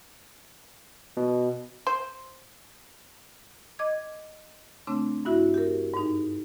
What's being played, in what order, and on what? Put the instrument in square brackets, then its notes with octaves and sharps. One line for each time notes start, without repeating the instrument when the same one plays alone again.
[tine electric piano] B2
[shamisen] C5
[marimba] D#5 D6 G#6
C#3 A3 C4 D4
G2 E4 F#4 E5
G4 A#4
G#2 D#4